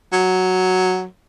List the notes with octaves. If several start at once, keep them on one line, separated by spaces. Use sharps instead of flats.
F#3